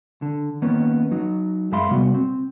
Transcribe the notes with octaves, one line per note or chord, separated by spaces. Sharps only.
D3
D#3 A#3 B3 C#4
F#3 D#4
F#2 G#3 E5 F5 B5 C6
C3 G3 B3 F#4
C4